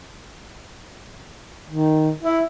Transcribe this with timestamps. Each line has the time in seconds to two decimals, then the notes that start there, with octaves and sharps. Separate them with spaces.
1.67 D#3
2.23 E4